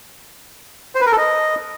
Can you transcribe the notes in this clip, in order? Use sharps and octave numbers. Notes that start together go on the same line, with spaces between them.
C5
B4
A#4
A4
D#5